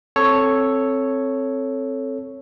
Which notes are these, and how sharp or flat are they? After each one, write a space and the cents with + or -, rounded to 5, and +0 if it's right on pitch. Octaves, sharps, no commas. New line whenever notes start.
C4 +10 A4 +0 C#5 +0